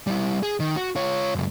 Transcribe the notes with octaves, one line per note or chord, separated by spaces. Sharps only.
G3 E4
G#4
D#3
F#4
F4 C#5
C#2 F#2